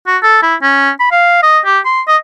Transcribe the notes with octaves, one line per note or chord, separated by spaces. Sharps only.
F#4
A4
E4
C#4
B5
F5
D#5
G4
C6
D#5